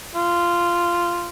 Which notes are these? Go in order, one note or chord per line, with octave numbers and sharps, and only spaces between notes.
F4